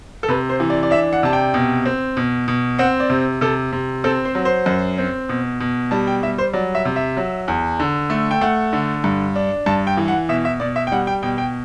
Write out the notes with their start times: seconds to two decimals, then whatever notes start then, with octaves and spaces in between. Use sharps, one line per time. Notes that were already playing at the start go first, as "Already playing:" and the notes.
0.23 A4
0.28 C3 B4
0.49 C5
0.60 E3
0.70 D5
0.83 D5
0.91 D4 E5
1.13 F#5
1.23 C3 A5
1.33 G5
1.54 B2
1.86 C4
2.17 B2
2.48 B2
2.79 C4 F#5
3.00 D5
3.10 C3
3.41 C3 A4
3.73 C3
4.04 C4 A4
4.25 C5
4.35 F#3
4.45 C5
4.66 F#2
4.98 C4
5.29 B2
5.60 B2
5.91 G3 A5
6.07 G5
6.23 G3 E5
6.38 C5
6.53 F#3 D5
6.75 E5
6.85 C3
6.96 E5
7.17 F#3
7.48 E2
7.80 D3
8.10 A3
8.31 G5
8.41 A3 F#5
8.73 D3
9.04 G2
9.36 D4
9.66 G2 A5
9.87 G5
9.97 E3
10.08 F#5
10.29 B2 E5
10.45 E5
10.60 B2 D5
10.76 E5
10.87 G5
10.92 G3 F#5
11.07 G5
11.23 B2 G5
11.38 G5